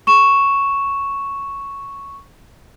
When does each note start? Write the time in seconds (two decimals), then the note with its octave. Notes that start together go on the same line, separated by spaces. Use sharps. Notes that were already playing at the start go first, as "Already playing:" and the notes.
0.07 C#6 E7